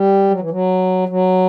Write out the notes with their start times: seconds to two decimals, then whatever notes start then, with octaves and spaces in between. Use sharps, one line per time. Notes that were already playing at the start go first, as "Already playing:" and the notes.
Already playing: G3
0.30 F#3
0.40 E3
0.51 F#3
1.09 F#3